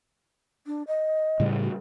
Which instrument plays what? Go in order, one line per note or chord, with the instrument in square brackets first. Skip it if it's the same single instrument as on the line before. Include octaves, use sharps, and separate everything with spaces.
[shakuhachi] D4
D#5
[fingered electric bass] A2 C#3 G3
[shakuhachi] F#4